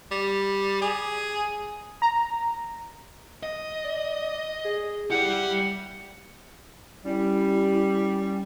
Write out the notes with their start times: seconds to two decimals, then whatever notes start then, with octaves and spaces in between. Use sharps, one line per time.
0.11 G3
0.82 G#4
2.02 A#5
3.43 D#5
3.84 D5
4.65 G#4
5.10 E4 G4 D5 F#5
7.05 G3 C#4 E4